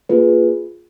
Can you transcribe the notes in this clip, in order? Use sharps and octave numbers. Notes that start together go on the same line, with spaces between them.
A#3 F4 G#4 B4